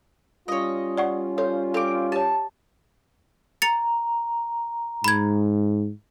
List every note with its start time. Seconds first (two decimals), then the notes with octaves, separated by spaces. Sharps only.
0.48 G3 C#4 F4 C#5 D#5
0.98 D5 F#5 C#6
1.38 A4 C5 C#5
1.74 C4 A4 D6
2.12 G4 C#5 A5
3.62 A#5 A6 C#7 F7
5.04 G#2 B5 G#6